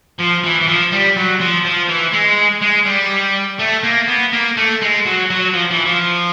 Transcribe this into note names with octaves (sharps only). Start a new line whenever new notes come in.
F3
E3
E3
F3
G3
F#3
F3
F3
E3
G#3
G#3
G3
A3
A#3
B3
A#3
A3
G#3
F#3
F#3
F3
E3
F3